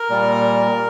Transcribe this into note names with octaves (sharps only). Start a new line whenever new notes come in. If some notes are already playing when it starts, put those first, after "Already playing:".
Already playing: A#4
A#2 G3